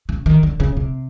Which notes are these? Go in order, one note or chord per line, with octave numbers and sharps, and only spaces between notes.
C#3
D#3
D3
C#3
C3